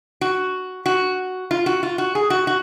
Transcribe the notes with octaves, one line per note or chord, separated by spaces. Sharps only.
F#4
F#4
F4
F#4
F4
F#4
G#4
F#4
F#4